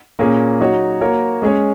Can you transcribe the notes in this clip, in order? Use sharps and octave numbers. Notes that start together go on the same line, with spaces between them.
A#2 A#3 C#4 G#4
F#3 D#4 F#4 C#5
A#3 F#4 A#4 C#5
G#3 C#4 G#4 C#5